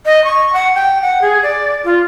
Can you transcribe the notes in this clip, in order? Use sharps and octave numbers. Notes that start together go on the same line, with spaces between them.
D#5
C#6
F#5
G5
F#5
G#4
D5
F4